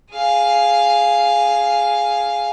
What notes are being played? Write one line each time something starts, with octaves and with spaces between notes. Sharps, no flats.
G#4 F5